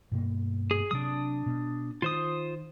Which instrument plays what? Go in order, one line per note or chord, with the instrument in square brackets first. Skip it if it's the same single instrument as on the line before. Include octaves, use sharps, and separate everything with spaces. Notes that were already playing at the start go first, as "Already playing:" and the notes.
[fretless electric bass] G2 B2 A#3
[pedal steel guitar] G#4
[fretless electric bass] C3 F#3 [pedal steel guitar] D4 D#6
[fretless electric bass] B2
[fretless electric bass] D#3 [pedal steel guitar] F4 C5 D#6